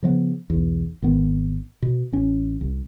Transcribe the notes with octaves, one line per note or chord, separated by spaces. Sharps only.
C#3 F3 G#3 B3
B1 E2
G#1 D#3 B3
B2
A1 C#4
C2